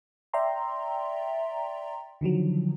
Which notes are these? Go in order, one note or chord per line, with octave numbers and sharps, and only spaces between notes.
D5 E5 G5 A#5 C6
D3 D#3 F3 F#3